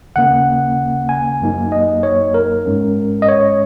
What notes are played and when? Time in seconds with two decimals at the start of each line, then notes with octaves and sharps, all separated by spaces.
0.16 D#2 C#3 A#3 C#4 F#5
1.09 G#5
1.41 F#2 F#3 A#3 D#4
1.72 D#5
2.03 C#5
2.34 A#4
2.66 G#1 G#2 G#3 C#4
3.22 D#5
3.28 C#5